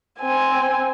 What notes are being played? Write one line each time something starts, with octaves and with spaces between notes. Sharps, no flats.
C4 G#5